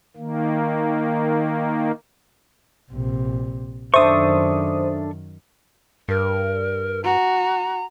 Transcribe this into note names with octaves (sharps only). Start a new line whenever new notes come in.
D#3 A#3
A#1 C3
F#2 D#3 D4 A4 C5 E5 C#6 D#6
G2 A#4
F#4 A#5